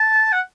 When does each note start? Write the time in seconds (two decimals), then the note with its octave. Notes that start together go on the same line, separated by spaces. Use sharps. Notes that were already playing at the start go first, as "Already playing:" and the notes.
Already playing: A5
0.32 F#5